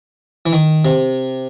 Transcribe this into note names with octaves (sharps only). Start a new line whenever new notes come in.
E3
D#3
C3